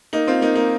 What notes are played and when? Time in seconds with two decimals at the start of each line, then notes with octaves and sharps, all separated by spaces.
0.13 A#3 D#4
0.27 C4 F4
0.41 A#3 D#4
0.55 A#3 D#4